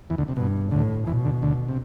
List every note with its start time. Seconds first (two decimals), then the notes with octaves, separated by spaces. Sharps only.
0.10 E2 E3
0.18 D2 D3
0.28 C3
0.37 G2 B2
0.71 D2 A2 D3
1.07 E2 B2 E3
1.25 D2 D3
1.42 D2 D3
1.69 C3